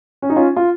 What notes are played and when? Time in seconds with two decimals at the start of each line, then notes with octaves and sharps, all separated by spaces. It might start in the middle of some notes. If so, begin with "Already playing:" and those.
0.22 C#4
0.30 D#4
0.36 C#4 F4
0.56 F4